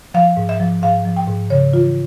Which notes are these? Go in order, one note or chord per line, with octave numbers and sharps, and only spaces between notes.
F3 F5
G#2
E5
F3
G#2 F5
F3
G5
G#2
C#3 C#5
E3 F4